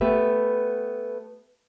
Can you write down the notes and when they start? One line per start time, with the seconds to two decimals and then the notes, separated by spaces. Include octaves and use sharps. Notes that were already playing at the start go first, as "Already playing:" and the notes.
0.01 A3 B3 G4 B4 E5